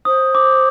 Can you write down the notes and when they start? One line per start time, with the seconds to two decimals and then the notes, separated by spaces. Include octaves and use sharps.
0.05 C5 D#6
0.35 D6